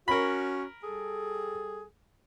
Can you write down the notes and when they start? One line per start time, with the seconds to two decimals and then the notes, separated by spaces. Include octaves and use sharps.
0.08 C#4 F#4 A#4 B5
0.84 G3 G#4 A4